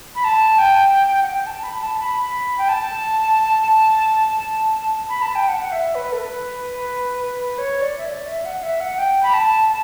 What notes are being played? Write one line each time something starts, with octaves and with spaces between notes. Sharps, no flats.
B5
A5
G5
F#5
G5
A5
B5
A5
A5
B5
G5
A5
B5
A5
G5
F#5
F#5
E5
B4
A4
B4
C#5
D5
E5
D5
E5
F#5
E5
F#5
G5
B5
A5
A5